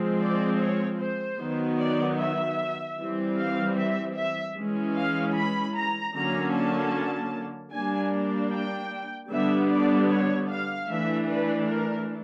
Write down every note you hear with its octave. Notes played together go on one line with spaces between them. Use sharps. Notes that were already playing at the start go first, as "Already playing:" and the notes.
Already playing: F3 G#3 C4
D5
C#5
C5
D#3 F#3 B3
D5
E5
E3 G3 C4
F5
E5
E5
E3 G#3 C#4
F5
B5
A#5
D3 F#3 A#3 C#4 A#5
A5
G3 A#3 D4 G#5
G5
D3 G3 B3 D4 E5
D5
C#5
F5
E3 A3 D4 E5
B4
A#4